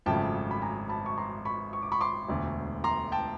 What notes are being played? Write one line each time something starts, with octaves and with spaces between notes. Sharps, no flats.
G#1 F#2 C#3 F3 A3 G5 A5
B5
G#5 A#5
A5 B5
C#6
A#5 C6
B5 C#6
C#6
D6
B5 C#6
C6 D6
E1 D2 D3
A#5 C6
G5 A5